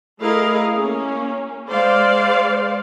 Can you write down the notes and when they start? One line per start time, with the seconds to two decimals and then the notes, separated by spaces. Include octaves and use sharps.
0.20 A3 E4 G#4 A#4 D#5 F5
0.75 A#3 C#4
1.71 G#3 C5 D5 F5